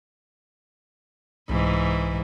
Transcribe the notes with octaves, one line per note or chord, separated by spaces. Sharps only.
C2 G#2 E3